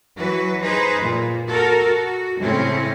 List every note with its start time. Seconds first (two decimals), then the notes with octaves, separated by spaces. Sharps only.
0.17 E3 F#3 F#4 B4
0.61 D#4 G#4 B4 C5
1.00 A#2
1.47 F#4 A4 A#4
1.84 F#4
2.39 A2 C#3 C4 C#4